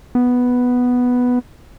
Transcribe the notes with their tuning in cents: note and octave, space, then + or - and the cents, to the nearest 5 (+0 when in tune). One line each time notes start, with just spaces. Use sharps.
B3 +0